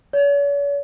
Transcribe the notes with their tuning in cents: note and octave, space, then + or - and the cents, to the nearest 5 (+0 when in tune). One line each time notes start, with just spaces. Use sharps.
C#5 +45